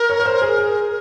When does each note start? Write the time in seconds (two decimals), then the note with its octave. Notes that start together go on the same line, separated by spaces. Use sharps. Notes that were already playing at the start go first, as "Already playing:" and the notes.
Already playing: A#4
0.10 C#5
0.20 C#5
0.25 C5
0.42 G#4
0.58 G#4